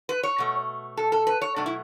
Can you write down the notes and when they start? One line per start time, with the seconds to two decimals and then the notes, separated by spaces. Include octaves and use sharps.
0.09 B4
0.23 C#5
0.38 B2 A3
0.97 A4
1.12 A4
1.27 B4
1.41 C#5
1.56 B2 F#3 A3 D4
1.66 E4